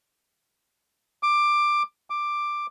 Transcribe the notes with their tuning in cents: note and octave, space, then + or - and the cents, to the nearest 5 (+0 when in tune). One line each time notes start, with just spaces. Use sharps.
D6 +15
D6 +10